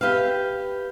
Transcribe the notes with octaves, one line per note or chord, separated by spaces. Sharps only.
G4 B4 E5 F5